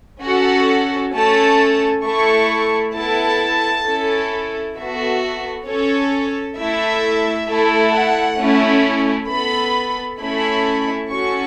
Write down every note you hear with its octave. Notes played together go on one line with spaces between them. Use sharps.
C#4 F#4 A4 F#5
A3 C#4 A4 A5
A3 E4 A4 C#6
B3 E4 A4 A5
C#4 E4 A4
B3 F#4 A4 E5
C#4 A4 C#5
A3 E4 A4 E5
A3 E4 A4
F#5
A3 C#4 E4
B3 A4 B5
A3 C#4 E4 A4 B5
C#4 F#4 A4 C#6